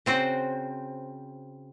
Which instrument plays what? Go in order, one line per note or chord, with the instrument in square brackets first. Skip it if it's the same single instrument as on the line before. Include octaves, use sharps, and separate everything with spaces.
[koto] C#3 C4 F#4 C5